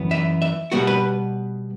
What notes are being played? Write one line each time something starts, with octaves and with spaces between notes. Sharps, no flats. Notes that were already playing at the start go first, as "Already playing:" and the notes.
Already playing: F#2 E3 B3
E5
E5
B2 G3 B3 F#4
B4